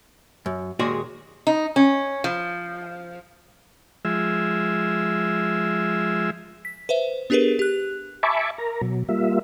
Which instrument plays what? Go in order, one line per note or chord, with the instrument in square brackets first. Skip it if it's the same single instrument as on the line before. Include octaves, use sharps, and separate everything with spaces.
[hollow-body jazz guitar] F#2
D#2 A#2 G#3 F#4 G#4 D5
[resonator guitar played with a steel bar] D#4
C#4
F3
[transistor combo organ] F3 G#3 E5
[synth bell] B6
B4 C5 E5
B3 D4 G4 G#4 A#4 B4
G4 F#6
[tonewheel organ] E5 G#5 A5 B5 C#6 D6
A#4 A#5
B2 F#3
G3 A#3 F4 E5